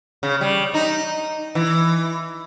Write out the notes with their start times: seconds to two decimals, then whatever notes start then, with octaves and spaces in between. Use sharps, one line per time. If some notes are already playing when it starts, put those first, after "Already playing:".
0.23 C#3
0.41 G3
0.74 D#4
1.55 E3